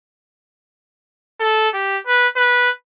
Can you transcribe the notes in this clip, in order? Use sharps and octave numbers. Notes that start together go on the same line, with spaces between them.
A4
G4
B4
B4